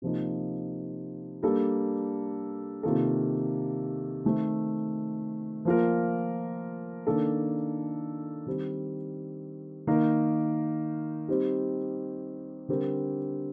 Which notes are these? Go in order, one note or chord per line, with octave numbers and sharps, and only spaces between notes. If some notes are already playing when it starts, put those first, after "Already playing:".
C3 F3 A#3 D#4
G3 A#3 D4 A4
C3 D#3 A#3 F4 A4
D#3 A3 C4
F3 A#3 F4 A#4
D#3 A#3 D4 A4
D#3 G3 C4
D#3 A#3 D#4 A#4
G3 C4 D#4 G4
D3 G3 C4 G4 A#4